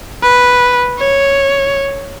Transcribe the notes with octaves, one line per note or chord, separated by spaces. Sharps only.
B4
C#5